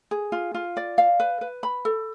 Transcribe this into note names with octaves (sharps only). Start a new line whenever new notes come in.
G#4
F4
F4
D5
F5
B4
B4
B5
A4